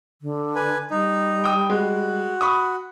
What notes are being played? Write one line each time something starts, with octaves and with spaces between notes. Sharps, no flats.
D3
B4 G#5
G3 D#4
G5 D#6
G#3 F#4
B5 C#6 D#6